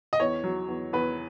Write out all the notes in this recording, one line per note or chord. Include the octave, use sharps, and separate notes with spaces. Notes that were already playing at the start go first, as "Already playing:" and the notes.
D#5
E2 C#5
F#3
E2
E2 B4